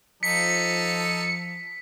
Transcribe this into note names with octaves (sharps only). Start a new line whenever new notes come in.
F3 D#4 A4 B6 C#7